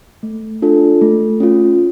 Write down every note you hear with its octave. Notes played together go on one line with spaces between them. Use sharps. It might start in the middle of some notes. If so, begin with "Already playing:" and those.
A3
D4 F4 A4
A3
C#4 F4